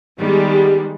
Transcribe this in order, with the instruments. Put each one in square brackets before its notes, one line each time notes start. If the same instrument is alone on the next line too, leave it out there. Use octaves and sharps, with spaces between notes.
[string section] D#3 G3 G#3 B3